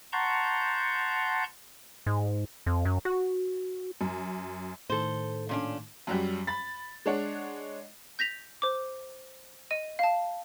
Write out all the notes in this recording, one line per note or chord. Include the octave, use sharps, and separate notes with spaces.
F#5 A5 A#5 C6 C#6 G6
G#2
F2
F#2
F#4
F#2
A2 D#3 A4 C5
A#2 C#4 D4
F#2 F#3 G3
B5 A6
G#3 D4 C#5 F#5
G6 A#6 B6 F7
C5 D6
D#5 D#7
F5 A5